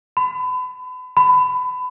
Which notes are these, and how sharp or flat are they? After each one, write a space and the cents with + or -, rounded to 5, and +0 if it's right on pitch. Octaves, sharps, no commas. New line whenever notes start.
B5 +35
B5 +25